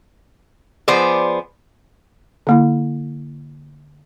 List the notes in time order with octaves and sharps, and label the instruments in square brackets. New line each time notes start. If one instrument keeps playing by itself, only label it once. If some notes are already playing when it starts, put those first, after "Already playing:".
[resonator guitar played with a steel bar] F3 B3 G#4 C5 D5
[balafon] D3 A#3 E4